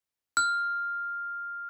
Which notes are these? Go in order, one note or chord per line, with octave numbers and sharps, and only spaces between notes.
F6